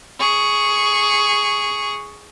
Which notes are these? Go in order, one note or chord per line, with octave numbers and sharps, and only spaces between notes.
G#4 C#6